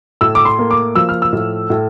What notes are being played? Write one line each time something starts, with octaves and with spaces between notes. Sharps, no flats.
A2 E6
D6
C6
A#3
D6
F3 E6
F6
E6
A2
A2